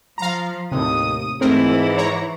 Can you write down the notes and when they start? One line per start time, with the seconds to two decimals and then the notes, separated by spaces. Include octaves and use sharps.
0.18 F3 F5 A#5
0.72 D#2 A2 C3 D#6
1.41 G#2 E3 A3 C4 E4 A#4
1.97 C#5 A#5